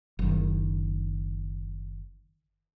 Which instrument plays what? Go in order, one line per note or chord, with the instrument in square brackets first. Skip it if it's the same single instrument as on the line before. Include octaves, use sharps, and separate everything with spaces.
[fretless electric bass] F#1 D#3